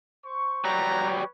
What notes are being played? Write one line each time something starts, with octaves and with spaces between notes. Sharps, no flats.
C5 C#6
F#3 G3 B4 C#5 A#5 C#6